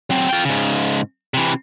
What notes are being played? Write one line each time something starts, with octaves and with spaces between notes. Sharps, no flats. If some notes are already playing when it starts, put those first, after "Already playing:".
F#3 C4
F4 G5
G#2 C#3
C3 E3